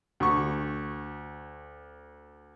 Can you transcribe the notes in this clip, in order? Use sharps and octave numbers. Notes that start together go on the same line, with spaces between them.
D2 C#6